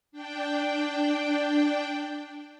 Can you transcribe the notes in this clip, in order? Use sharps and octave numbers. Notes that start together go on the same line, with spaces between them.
D4 G5